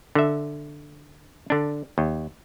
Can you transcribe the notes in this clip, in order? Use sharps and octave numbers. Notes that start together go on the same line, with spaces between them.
D3 E5
D3 D4
D#2